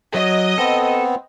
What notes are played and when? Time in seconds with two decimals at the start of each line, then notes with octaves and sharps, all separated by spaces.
0.14 F#3 D#5
0.58 B3 C4 A4